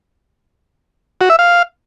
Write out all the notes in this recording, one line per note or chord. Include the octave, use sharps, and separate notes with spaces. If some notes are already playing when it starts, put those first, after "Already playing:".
F#4
E5
F5